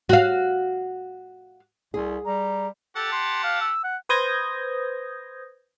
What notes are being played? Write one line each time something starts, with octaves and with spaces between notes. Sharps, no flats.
F#4 F5
C2 G#4
G3 A#5
G4 A4 F#5 A5
C6
F5
E6
F#5
B4 C5 D#6 G6 G#6 A#6